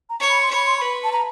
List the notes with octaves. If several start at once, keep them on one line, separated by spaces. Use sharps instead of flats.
A#5
C#5
B5
C6
C#5 B5
C6
B4 B5
A5
A#5